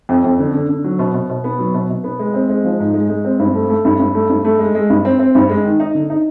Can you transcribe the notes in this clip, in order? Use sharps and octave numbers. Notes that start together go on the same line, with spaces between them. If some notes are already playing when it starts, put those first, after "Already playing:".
F2
F2
D3
D3
D3
F#3
B2
B2
B2
B3
F#3
B2
B2
B3
G#3
C4
G#3
F3
G#2
G#3
G#3
C4
G2
A3
A3
G2
G2
A3
G2
A3
G#3
G#3
G2
C4
C4
G2
G#3
D#3
D#4
D3
D#4